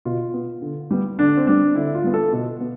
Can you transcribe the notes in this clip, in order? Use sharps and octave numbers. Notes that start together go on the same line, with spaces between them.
B2 F4
B3
D3
G3 B3
D3 D4
C4
G3 B3 D4
D3 E4
F4
G3 B3
A4
B2
B3